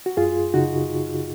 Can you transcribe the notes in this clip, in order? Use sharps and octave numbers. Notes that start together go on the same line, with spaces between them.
F#4
F#2 F4 G#4
C#3 D#4 F#4